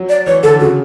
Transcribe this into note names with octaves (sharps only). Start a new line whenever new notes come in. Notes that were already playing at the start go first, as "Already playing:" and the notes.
Already playing: F#3
D5
E3 C#5
D3 A4
C#3 F#4